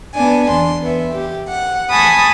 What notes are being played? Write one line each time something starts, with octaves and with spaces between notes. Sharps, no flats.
B3 D4 G#5
E2 C6
B3 E5
G4
F#5
G#5 A5 B5 C#6 D#6